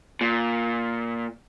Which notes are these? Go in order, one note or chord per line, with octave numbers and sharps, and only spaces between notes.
A#2